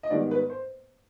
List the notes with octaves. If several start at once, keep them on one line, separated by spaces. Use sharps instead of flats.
D#5
G#2 D#3 G3 B3 D5
B4
C5